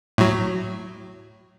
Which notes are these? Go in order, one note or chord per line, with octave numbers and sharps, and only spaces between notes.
A2 F#3